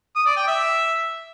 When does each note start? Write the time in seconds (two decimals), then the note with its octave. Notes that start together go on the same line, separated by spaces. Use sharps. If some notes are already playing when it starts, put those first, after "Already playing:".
0.16 D#6
0.26 D5
0.37 G5
0.47 E5